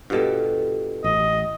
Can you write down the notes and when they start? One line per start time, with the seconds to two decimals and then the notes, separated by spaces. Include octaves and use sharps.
0.10 G2 B2 F4 G4 A4
1.04 A1 D#5